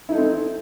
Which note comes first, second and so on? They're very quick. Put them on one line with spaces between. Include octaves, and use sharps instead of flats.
E4 D#4 A4 C4